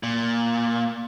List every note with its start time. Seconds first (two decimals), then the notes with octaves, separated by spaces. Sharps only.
0.03 A#2